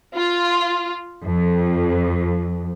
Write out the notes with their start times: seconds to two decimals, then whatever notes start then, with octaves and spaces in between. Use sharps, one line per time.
0.16 F4
1.24 F2